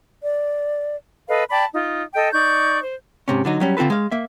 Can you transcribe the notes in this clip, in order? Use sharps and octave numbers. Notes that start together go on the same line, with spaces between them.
D5
A4 B4 D#5 F5
D5 G5 A5 B5
D#4 F4
A4 D#5 G5
D#4 D5 C#6 G6
C5
G#2 C3 C#4
D3 F#3 D#4
F#3 G3 C#4
D3 C4 F4 A4 B4
G#3 F5
A#3 E5